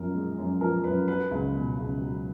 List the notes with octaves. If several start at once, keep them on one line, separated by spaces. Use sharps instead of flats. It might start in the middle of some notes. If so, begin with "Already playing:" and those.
Already playing: F#2 F3 A#4
G#3
F#2
F3 A#4
F#2 B4
F#3 B4
C#2
B2
C#2
F#3